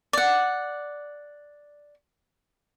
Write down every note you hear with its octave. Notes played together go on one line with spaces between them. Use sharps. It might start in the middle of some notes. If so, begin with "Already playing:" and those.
D5 F#5